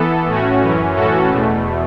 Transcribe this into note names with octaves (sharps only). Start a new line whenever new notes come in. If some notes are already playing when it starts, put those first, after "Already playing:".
Already playing: E3 B3 A4
A2 A3 C#4 F#4
F#2 E3 C#4
A2 E3 C#4 F#4 A4
E2 B2 A3